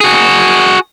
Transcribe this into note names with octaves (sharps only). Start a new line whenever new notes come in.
F#4 G#4